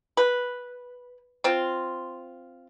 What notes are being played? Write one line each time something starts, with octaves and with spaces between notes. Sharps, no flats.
B4
C4 F4